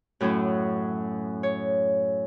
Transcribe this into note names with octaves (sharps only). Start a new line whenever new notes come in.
F#2 A2 F#3 C#4
C#5